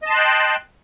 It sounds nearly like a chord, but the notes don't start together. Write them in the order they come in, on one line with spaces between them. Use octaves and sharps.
D#5 A5 C6 F#6 G5